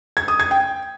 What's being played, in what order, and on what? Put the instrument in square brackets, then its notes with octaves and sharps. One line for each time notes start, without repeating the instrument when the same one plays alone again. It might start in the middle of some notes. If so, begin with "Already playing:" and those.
[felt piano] G#6
D#6
G#6
G5